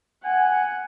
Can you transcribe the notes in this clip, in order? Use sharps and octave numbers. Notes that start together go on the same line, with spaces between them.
F#5 G#5